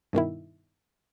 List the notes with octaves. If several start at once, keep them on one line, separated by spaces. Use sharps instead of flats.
G2 B2 D#3 E4